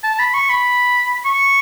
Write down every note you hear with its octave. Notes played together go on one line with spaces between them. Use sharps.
A5
B5
C#6
B5
C#6